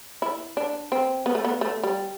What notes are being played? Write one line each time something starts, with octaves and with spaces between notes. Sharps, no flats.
E4
D4
C4
B3
A3
B3
A3
G3